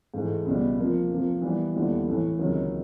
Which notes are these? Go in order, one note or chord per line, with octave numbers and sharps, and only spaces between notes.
G#2 E3 A3
C#2 B2 G3 B3
C3 F3 A#3
F2 C3 F3 A#3
E3 G3 B3
D#2 D3 G3 B3 E4
A2 E3 A3
C#2 C3 D#3 F#3 A#3